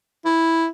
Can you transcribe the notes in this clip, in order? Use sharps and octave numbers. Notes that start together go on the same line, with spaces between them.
E4